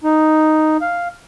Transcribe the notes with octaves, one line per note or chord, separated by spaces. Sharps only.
D#4
F5